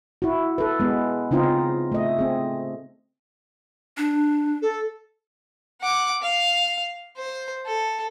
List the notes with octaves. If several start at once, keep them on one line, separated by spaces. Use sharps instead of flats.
E4 F#4
A4 B4
G#3 B3
C#3 C4 D#4 F4 D#5
A3 D#5
C4 G#4
D4
A4
F#5 D6
F5
C5
A4